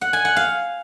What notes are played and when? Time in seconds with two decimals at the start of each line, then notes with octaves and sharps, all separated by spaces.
0.01 F#5
0.13 G#5
0.25 F#5
0.36 F5